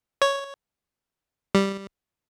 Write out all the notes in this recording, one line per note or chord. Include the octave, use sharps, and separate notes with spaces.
C#5
G3